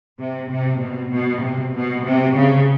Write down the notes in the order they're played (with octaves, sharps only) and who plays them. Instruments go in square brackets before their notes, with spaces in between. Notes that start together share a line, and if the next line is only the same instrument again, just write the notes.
[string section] C3
C3
B2
B2
C3
B2
C3
C#3